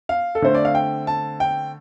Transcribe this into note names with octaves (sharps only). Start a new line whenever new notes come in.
F5
A4
D3 A3 C4 C5
D5
F5
G5
A5
G5